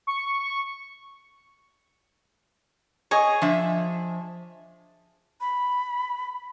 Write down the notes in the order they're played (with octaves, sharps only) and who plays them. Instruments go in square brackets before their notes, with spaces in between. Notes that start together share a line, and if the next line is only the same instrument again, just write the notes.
[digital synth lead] C#6
[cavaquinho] G#4 D#5 C#6 [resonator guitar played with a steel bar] C#5
[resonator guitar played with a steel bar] F3 D4 E5
[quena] B5